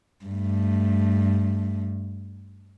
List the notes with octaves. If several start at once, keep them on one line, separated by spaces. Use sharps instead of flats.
G2 A3